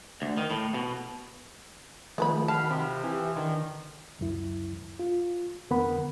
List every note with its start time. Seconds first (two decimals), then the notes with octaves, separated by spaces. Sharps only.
0.22 D2
0.38 D#3
0.51 A2
0.74 B2
2.18 D#3 F3 G#3 A3 B3 B5
2.48 D#3 F#4 F5 A5 B5
2.70 C3 F3
3.04 E3 G4
3.36 D3 D#3
4.19 C#2 F#2 E4
4.99 F4
5.70 F2 D3 B3 A#4 F#5 B5